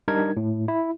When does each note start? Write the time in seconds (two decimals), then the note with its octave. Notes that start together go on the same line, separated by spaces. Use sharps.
0.08 G3 D4 D#4 A#4 G#6
0.37 A2
0.68 E4